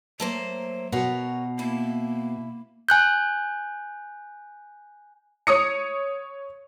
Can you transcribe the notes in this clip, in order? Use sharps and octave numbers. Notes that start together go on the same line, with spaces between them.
F#3 A3 A#3 C5
B2 B3 F#4 A#4 C#5
A#3 E4
G#5 F#6 G6
C#5 D#6 C#7